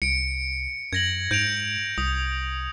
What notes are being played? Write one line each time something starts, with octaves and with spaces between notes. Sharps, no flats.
C2 C#7 D7
F#2 G#6 A#6 F#7
G#2 G6 D7 F7
C2 D#6